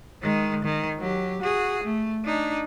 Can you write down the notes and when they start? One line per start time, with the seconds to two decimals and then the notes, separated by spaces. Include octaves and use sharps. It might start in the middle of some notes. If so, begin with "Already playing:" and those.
0.22 D#3 G#3
0.65 D#3
0.99 F#3 G4
1.42 F#4 G#4
1.84 A3
2.25 D4 D#4